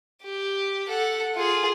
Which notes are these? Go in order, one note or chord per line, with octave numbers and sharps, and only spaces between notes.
G4
A4 F#5
F4 G#4